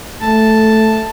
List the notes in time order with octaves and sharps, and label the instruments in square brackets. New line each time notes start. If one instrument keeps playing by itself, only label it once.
[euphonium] A3 [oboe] A5